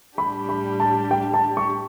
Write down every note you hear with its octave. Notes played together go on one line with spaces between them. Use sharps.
A2 G3 D4 G4 B5
B5
A5
G5
A5
C#6